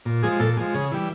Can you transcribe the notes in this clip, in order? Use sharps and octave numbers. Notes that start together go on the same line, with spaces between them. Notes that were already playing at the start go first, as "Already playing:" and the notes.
A#2
F3 G#3 G#4
A#2 A4
F3 G#3
C#3 G#4
E3 G3